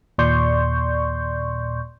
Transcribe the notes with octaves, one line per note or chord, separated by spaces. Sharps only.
D#2 A#2 D5 C6 C#6 G6